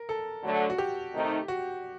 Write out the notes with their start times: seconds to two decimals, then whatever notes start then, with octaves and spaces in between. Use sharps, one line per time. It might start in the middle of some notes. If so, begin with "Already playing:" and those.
Already playing: A#4
0.09 A4
0.44 D3 F#3 A3
0.70 F#4
0.78 G4
1.13 C3 D#3 A3 D#4
1.48 F#4